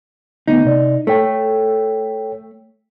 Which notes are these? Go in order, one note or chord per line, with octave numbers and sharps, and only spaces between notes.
D3 A3 B3 D#4
C3 D5
A3 A4 C#5 G5